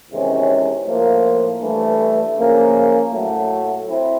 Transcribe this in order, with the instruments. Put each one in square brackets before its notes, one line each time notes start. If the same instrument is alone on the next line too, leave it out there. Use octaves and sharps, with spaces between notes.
[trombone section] E2 C3 D#3 G#3 C#4
A2 F3 A#3
G2 E3 A3
C#3 F3 A#3 C#4
A2 F#3 A3
C4 E4